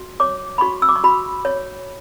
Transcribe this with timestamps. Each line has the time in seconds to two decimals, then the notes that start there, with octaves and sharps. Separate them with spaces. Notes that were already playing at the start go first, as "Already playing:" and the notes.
Already playing: F#4
0.20 C#5 D6
0.58 B5
0.61 F#4 C#6
0.82 E6
0.89 D6
0.96 C#6
1.04 F#4 B5
1.45 C#5